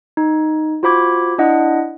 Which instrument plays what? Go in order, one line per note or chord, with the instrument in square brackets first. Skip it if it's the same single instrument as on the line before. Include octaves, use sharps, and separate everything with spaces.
[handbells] D#4
F4 F#4 C5 B5 D6 G#6
D4 E4 D#5 F#5